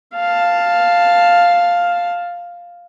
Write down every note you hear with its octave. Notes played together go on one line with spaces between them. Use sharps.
F5 A5